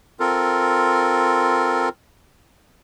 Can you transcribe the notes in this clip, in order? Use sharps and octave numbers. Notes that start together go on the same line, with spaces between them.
C4 F4 A4 A#4